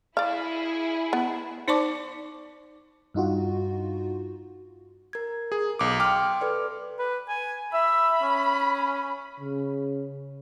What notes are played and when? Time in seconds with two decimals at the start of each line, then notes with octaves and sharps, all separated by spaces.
0.17 E4 G#4 D5 F5
1.13 B3
1.68 D#4 C5 D5 A5 C#6 D6
3.14 G2 D#4 F4 F#4
5.13 A#4 G#6
5.52 G#4
5.79 B1 D6
6.00 G5 C6 D6 F6
6.41 A4 B4 D5
6.99 B4
7.29 G#5
7.73 E5 B5
8.22 C#4
9.40 C#3